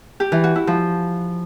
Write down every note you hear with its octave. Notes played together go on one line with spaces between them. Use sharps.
G4
E3
F#4
E4
F3